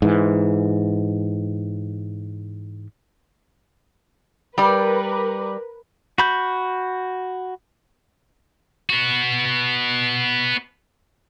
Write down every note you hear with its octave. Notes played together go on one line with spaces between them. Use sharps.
G#2 E3
G3 A#4 B4 D5
F#4 B5 G6
B3 F#4